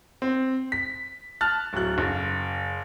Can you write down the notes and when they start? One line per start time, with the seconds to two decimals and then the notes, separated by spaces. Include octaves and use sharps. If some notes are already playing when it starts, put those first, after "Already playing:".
0.22 C4
0.72 B6
1.41 A5 F6 F#6 A6
1.73 D1 F#3 F#6
1.98 F#1